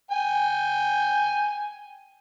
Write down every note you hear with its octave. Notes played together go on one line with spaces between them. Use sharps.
G5 G#5